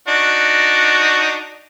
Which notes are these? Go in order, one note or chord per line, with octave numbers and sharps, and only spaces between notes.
D4 D#4 F#4